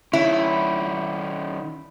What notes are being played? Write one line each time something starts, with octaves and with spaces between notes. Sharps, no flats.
D#3 C#4 E4